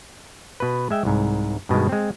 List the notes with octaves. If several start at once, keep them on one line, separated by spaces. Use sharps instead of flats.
B2 B4
G#3 E5 G5
C2 G#2
G2 B2 D#3 G#3
G#3 C4